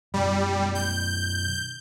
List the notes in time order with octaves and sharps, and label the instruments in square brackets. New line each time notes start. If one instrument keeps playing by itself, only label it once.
[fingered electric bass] F#2 B2 [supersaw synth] G3
[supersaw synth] G6